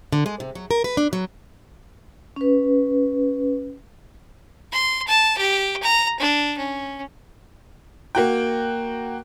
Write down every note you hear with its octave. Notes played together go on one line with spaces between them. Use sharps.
D3
G#3
C3
F#3
A#4
B4
D4
F#3
C#4 B4
C6
A5
G4
A#5
D4
C#4
A#3 F#4 G5